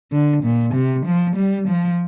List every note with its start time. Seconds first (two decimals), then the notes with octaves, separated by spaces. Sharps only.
0.12 D3
0.44 A#2
0.74 C3
1.06 F3
1.36 G3
1.68 F3